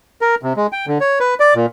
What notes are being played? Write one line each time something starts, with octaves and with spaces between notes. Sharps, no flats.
A#4
C3
G#3
G5
D3
C#5
B4
D5
A#2